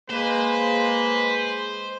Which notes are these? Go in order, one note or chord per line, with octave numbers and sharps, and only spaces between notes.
G#3 A#3 B4 C5